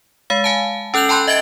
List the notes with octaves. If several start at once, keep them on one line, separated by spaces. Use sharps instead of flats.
G#3 F5
F5 G#5 A5
C#4 A4 F#6 G6 F7 F#7
G5 A5 B5 C6 F#6 G6
D#5 E5 G#6 A6 D7